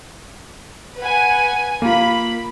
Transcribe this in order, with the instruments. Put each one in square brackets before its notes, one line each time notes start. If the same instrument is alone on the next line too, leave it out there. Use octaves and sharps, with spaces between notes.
[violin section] B4 F#5 G#5
[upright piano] A#3 F4 [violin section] B5